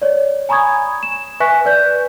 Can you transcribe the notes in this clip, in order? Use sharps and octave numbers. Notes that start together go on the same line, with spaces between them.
C#5 D5
G#5 A#5 B5 C#6 D#6 G#6
E7
B4 E5 G#5 C#6 F#6 B6
B4 D5 G6